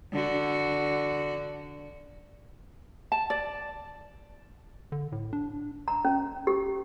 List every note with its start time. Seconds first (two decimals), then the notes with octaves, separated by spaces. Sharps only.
0.12 D3 F#4
3.12 A5
3.30 D5
4.92 D3
5.12 A2
5.33 D4
5.88 A#5
6.05 C#4
6.47 G4